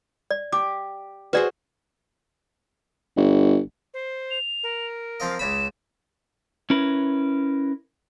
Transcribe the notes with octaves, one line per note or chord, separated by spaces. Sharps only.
D5
G4 D6
F#4 G#4 B4 C5 D5
G1
C5
F7
A#4
F3 C4 D#5 F5
C#2 C#3 B5 E7
C#4 E4 A#4 B4